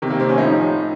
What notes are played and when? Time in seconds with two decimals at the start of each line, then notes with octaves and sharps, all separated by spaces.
0.02 C3 D#3
0.10 A#3
0.20 C4
0.29 C#4
0.38 A2 F3 D#4